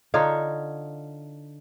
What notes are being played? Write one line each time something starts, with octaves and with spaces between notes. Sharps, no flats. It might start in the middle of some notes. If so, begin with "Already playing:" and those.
D3 D#4 F4 C#5